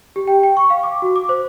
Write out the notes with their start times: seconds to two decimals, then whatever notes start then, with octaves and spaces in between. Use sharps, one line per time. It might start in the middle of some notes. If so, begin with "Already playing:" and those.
0.16 G4
0.28 G5
0.43 G5
0.57 C#6
0.70 F5
0.83 D6
1.02 F#4
1.16 D6
1.29 C5